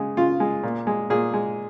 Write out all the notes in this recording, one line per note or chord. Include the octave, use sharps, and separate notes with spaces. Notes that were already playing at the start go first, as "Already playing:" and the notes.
Already playing: C#3 G#3
C#3 F4
G#3
A#2
G#3
A#2 G#4
G#3